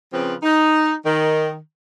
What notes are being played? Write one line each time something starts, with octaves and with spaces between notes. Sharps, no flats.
C#3 F3 C4 B4
D#4
D#3